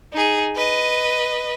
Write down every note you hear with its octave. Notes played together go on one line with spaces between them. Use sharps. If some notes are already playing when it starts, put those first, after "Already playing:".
D#4 G#4
B4 D#5